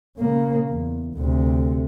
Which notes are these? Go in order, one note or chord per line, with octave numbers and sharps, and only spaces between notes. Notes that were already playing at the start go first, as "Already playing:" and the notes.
C#3 A#3
E2
D2 C3